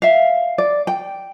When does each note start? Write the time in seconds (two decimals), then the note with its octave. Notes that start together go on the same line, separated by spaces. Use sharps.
0.02 E5 F5
0.58 D5
0.87 G5